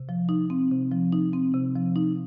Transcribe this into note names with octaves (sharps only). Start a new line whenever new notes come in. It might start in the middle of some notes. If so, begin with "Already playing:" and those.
Already playing: C3
F3
D#4
C4
C3
F3
D#4
C4
C3
F3
D#4